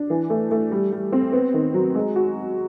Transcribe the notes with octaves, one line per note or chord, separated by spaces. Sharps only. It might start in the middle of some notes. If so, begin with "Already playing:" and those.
Already playing: D4
E3
A3
A3
G3
G3
C4
B3
D#3
F#3
G#3
F#4